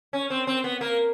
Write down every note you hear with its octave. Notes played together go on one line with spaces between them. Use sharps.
C#4
C4
C4
B3
A#3